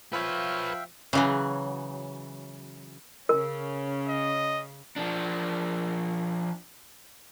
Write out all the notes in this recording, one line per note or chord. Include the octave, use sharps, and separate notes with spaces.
F3 B4 C#5 E5 F5 G5
C#3 E3 F#3
C#3 C#4 A#4
D#5
F3 D4